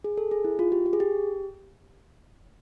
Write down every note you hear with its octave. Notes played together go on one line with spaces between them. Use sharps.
G#4
A4
G#4
E4
F4
G4
G4
G#4
G4